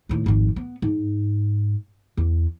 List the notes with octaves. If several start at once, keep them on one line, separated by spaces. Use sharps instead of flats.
D#2 A2
G#1 F2
B3
G#2
E2